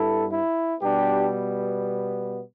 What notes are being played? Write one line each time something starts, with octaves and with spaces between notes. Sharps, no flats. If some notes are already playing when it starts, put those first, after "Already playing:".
Already playing: G2 G3 B3 E4 A4
E4
B2 G3 B3 D4 G4